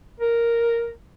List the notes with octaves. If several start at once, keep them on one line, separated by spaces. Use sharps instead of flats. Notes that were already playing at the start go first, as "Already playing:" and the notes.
A#4